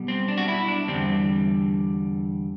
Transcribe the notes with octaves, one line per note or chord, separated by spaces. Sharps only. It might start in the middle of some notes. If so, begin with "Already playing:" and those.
Already playing: B1 B2 G3
C4
D4
F#4
E4
D4
E2 D3 G3 C4